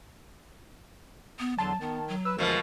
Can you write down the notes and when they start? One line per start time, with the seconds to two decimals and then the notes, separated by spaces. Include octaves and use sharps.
1.39 B3
1.58 E2 D3 F#3 A5 C6
1.81 D#3 B3
2.08 F#3
2.25 B4 E6
2.38 D2 B2 E3 F3 G#3 A#4